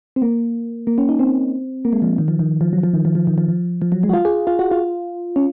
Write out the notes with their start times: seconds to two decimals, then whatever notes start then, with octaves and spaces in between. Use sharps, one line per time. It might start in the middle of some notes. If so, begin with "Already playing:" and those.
0.16 C4
0.22 A#3
0.87 A#3
0.98 C#4
1.09 D#4
1.19 C4
1.85 A#3
1.93 G#3
2.02 F3
2.18 D#3
2.28 F3
2.39 D#3
2.61 F3
2.73 F#3
2.83 F3
2.93 D#3
3.05 F3
3.15 F3
3.27 D#3
3.38 F3
3.48 F3
3.82 F3
3.92 F#3
4.03 G#3
4.09 F#4
4.13 F4
4.25 G#4
4.47 F4
4.59 F#4
4.71 F4
5.36 C#4